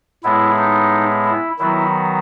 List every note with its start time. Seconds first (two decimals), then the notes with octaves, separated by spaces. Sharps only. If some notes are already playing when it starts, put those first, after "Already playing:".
0.24 A2 G#3 B3 E4
0.58 D#4
1.25 E4
1.59 D#3 F#3 B3 E4